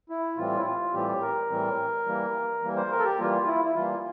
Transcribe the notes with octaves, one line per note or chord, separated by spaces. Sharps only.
E4
A2 E3 G3 C4 F4
E4
F4
A2 E3 G3 C4 G4
A#4
A2 E3 G3 C4
E3 G3 A#3
E3 G3 A#3
C5
A#4
A4
G4
E3 G3 A#3 F4
E4
E4
E3 G3 A#3 F4